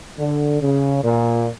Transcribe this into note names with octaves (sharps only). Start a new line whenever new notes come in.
D3
C#3
A#2